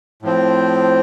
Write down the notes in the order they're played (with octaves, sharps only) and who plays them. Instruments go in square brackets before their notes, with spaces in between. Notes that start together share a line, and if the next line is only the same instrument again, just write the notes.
[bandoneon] A2 F3 C4